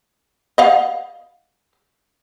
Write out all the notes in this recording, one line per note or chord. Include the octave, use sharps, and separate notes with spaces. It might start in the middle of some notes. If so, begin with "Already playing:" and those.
D#5 F5 F#5